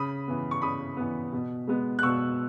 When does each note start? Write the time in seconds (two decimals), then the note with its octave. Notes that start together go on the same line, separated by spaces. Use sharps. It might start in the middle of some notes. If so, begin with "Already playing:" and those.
Already playing: C#3 B5 D#6
0.28 E3 B3
0.51 C#6
0.62 C#3 B5 D#6
0.97 E3 B3
1.33 B2
1.67 G#3 B3
1.99 F#6
2.03 B2 C#6 E6